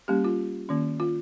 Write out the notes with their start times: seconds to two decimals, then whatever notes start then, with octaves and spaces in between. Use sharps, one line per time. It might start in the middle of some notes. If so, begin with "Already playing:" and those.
0.08 G3 A#3 C#4 G4
0.24 F4
0.69 D#3 A#3 C#4
1.00 F4